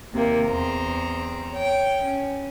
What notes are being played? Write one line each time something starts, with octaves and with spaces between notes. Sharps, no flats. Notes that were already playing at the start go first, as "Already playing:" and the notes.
D#2 C3 A#3
E2 C4 A#5
C#5 G5
C#4